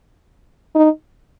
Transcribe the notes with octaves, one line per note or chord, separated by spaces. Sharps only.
D#4